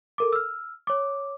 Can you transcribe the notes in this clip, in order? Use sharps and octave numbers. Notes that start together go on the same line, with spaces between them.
A4 A#4 D6
E6 F6
C#5 D6